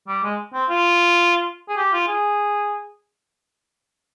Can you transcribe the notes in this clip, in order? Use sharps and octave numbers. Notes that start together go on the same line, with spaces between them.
G3
G#3
C4
F4
G#4
G4
F4
G#4